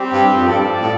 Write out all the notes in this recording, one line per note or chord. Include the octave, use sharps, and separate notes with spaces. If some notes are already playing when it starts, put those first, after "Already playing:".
Already playing: G3 C4 G4
G2
F2
G2 F4 A4 D5
A2